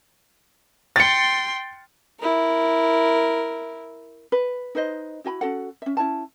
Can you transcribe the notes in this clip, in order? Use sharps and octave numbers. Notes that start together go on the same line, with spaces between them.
G5 C6 A6 C#7
E4 A#4
B4
D#4 B4 C5 D#5
E4 F#4 G#5 B5
C#4 F#4 A4 F#5
C#4 E5
C#4 E4 C#5 A5